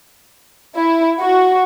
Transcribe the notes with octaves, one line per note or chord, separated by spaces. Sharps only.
E4
F#4